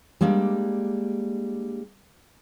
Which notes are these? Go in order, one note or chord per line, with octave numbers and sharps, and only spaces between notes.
G3 G#3 A#3 D4